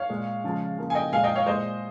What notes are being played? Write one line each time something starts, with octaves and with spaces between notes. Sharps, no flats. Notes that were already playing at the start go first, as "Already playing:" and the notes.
Already playing: C#5 F5
A#2 G#3
C#3 F3 G#3
C#3 F3 A#3
G#5
D#5 G5
A#2 G#3 F5 G#5
D#5 G5
C#5 F5
A#2 G#3 C5 D#5